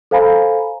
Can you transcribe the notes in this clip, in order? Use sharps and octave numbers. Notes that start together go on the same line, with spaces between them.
A4 C5 F5 G#5 A#5 B5